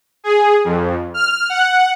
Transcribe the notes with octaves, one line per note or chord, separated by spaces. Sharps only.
G#4
F2
F6
F#5